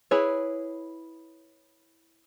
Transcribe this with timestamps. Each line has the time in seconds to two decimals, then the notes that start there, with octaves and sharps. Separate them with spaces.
0.11 E4 G#4 B4 C#5